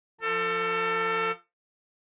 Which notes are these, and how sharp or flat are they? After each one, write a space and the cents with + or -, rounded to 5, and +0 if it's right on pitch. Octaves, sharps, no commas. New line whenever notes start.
F3 +0 A4 +30